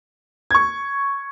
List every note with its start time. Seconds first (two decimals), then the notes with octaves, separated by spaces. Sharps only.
0.51 C#6 G#6